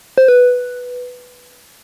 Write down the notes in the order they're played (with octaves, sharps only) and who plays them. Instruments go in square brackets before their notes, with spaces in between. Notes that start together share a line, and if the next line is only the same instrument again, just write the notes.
[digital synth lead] C5
B4